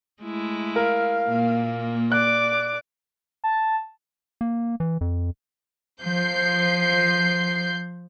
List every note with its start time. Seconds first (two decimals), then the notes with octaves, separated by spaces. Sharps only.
0.23 G#3 A3 E4
0.76 A#4 F5
1.25 A#2 A#3
2.12 D5 D6 F#6
3.44 A5
4.41 A#3
4.80 E3
5.01 F2
6.01 F3 G6 C7